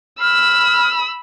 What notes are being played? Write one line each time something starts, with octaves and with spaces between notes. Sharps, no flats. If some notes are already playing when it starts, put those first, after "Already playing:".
B5 E6 F6